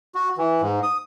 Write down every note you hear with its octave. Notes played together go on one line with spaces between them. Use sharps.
F#4
E3
G#2
D#6